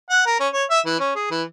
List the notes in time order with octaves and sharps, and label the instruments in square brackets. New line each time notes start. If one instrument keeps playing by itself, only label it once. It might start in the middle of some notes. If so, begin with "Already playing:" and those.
[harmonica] F#5
A#4
C#4
C#5
E5
E3
C#4
G#4
E3